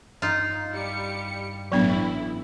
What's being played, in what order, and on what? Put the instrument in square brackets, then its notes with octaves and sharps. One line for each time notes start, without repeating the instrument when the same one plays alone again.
[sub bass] G2 [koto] D#4 F4
[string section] G3 C#7
[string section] A1 E4 [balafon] F#3 B3 D4